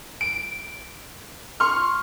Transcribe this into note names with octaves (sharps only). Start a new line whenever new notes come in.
D7
C6 C#6 F6